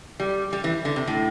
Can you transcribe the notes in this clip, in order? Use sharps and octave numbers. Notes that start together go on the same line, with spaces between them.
G3
G3
E3
D3
C3
A2